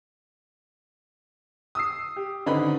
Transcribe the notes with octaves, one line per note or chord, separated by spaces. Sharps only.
D#6 E6 C7
G4
G#1 D3 C#4 D#4 B4 B5